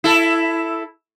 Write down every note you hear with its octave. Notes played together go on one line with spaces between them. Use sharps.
E4 A4